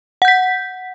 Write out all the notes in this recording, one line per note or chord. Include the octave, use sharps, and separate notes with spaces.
F#5 G6 B6